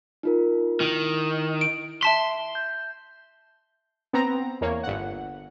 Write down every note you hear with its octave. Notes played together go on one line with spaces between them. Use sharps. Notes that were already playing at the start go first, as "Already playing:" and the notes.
D#4 F4 A#4
D#3 E4
D7
E5 A5 C6 B6
G6
B3 C4 A#5 A#6
E2 A#3 C#5
G1 F#5